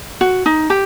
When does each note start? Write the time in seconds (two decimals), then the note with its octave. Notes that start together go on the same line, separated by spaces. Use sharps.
0.21 F#4
0.46 D#4
0.70 G4